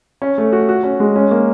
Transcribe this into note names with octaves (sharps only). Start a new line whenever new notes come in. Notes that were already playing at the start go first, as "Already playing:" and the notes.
C#4
A3
F#4
F#4
C#4
G#3
C#4
A#3